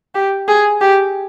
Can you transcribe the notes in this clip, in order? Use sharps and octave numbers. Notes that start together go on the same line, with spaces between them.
G4
G#4
G4